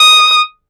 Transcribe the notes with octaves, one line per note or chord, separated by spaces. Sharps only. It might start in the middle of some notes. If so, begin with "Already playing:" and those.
Already playing: D#6